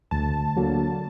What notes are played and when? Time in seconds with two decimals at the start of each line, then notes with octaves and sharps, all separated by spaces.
0.11 D2 A5
0.57 D3 F#3 A#3